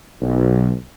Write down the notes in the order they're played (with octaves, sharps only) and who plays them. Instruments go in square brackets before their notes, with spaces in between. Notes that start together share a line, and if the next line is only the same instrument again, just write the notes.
[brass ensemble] B1